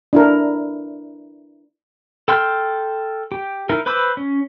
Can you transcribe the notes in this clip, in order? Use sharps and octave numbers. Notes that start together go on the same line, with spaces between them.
D4 E4 A#4
A4 G5 C6 F6
G4
D#4 E4 A#4
B4 C5 B5 D6 E6
C#4